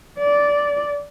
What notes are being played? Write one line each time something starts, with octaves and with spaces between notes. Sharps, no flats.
D5